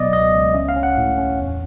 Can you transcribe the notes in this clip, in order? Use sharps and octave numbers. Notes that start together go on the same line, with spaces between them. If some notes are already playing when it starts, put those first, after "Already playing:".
Already playing: B2 F#3 B3 D5 D#5
C#2 D#5
C#2
C#4 E5
F5
C#4
F#5
A2
C#4
E2